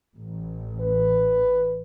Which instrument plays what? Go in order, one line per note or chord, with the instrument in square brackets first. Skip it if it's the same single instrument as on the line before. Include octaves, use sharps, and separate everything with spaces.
[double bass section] A1
[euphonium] B4